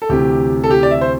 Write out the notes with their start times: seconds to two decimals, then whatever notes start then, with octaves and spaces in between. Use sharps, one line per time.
0.02 A4
0.09 D2 C3 E3 G4
0.64 A4
0.71 G4
0.83 D5
0.91 E5
1.01 C5